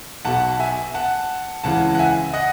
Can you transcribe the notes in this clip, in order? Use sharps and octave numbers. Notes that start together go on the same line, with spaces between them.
B1 B2 F#5 A5
E5 G#5
F#5 A5
C#2 C#3 E3 F#5 A5
F#5
E5 G#5
D#5 F#5